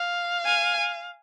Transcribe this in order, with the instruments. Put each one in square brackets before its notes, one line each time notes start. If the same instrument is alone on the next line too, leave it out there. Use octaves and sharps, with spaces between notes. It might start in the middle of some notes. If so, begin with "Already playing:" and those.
Already playing: [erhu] F5
[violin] G#5